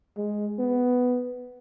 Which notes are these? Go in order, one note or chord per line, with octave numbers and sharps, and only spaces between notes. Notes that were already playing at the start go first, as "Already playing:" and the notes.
G#3
B3